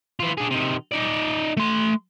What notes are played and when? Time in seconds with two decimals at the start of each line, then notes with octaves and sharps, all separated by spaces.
0.20 E3 F4
0.37 D4 G#4
0.50 C3 D#3
0.91 D#4 D5
1.57 A3 C6